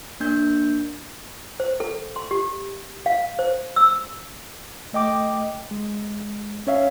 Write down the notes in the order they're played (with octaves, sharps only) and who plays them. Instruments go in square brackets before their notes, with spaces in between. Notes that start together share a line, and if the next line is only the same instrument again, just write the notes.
[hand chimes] A#3 D4 G6
[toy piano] C5
A4
C6
G4
F5
C5
E6
[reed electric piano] A3 D#5 G5 D6
G#3
C#4 C#5 E5 F5